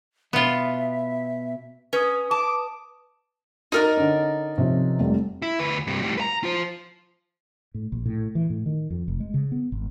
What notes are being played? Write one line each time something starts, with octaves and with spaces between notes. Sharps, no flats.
B2 B3 F4 E5
C#4 B4 D#6
A5 D6
D#4 F#4 A#4 D5
D3 C#4
C3 F3 C#4
F1 G3
E4
D2 B4
G2 C3
A2 G3
B4 A#5
F4 C5
A2
A#1
A2
E3
A2
D#3
F2
F1
G#3
C#3
B3
G#1